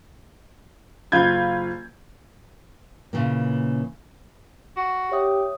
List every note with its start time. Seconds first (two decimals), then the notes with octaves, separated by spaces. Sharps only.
1.12 F#1 F4 B5 G6 G#6
3.13 A#2 C#3 E3 A#3
4.77 F#4
5.12 G4 C#5 E5 D#6